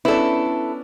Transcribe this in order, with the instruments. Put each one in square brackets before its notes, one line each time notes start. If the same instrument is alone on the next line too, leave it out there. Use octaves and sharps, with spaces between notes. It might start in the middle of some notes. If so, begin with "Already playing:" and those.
[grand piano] B3 C#4 D4 [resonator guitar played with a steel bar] E4 A4